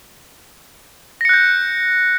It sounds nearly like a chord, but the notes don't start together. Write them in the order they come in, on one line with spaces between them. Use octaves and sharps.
A#6 C#7 F#6 G6